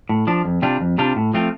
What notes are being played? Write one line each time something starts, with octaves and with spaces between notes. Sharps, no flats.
A2
F3 D4
F2
C3 G3 D4 F4
F2
C3 G3 D4 F4
A2
F3 A3 C4 F4